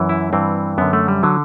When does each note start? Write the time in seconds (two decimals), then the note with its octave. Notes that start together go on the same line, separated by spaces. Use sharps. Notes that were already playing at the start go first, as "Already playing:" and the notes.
Already playing: F#2 E3
0.09 E4
0.33 G2 E3 C4
0.78 F#2 D3 B3
0.93 A3
1.08 G3
1.23 D3 F#3